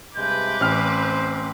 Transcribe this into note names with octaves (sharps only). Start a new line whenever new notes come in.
G2 C3 G#3 B4 D6 G6
A1 C4 C5 F6